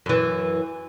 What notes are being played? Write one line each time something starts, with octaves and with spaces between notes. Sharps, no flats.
F#2 E3